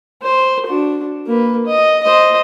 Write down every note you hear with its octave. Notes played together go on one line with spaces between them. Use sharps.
C5
D4 F#4
A#3 B4
D#5
C5 D#5